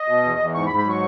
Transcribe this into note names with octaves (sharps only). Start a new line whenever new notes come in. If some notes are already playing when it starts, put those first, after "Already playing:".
Already playing: D#5
B2
E2
E2
G#2 C#6
B5
G#2
B5
F#3 C#6